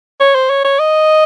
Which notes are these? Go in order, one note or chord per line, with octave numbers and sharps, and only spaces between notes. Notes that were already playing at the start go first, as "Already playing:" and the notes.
C#5
C5
C#5
C#5
D#5